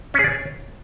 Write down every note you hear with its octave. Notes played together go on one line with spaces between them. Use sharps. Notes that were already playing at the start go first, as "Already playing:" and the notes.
C#4
G#4
D5
C#5